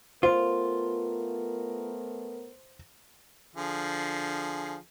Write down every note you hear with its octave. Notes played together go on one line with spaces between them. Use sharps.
A3 B3 F4 A#4 C5
D3 F3 G#4